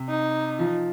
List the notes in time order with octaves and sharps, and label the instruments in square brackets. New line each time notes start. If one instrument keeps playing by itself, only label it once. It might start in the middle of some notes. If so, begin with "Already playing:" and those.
Already playing: [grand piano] C3
[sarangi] D#4
[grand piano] F3